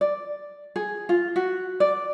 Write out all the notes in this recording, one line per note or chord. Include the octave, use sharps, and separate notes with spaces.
D5
G#4
F4
F#4
D5